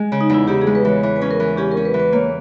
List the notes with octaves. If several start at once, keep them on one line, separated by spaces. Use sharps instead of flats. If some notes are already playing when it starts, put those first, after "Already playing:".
Already playing: G#3
C#3
D#4
E2 E4
C#3 G4
G#4
G#3
B4
E3 C#5
E3 C#5
B4
C#4
A#4
E3
C#4 G4
A#4
C#4
B4
E3
B4
A#3 C#5